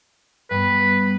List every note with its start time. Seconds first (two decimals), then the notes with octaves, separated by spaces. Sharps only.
0.51 G2 B3 B4